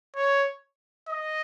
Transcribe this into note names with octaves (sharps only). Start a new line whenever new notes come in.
C#5
D#5